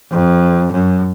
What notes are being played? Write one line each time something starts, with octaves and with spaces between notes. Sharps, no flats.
F2
F#2